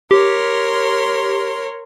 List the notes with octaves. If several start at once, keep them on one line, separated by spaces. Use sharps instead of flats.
G4 A#4 C#5 C6